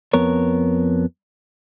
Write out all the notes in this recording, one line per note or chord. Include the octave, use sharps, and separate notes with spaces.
F2 B3 A#4 C#5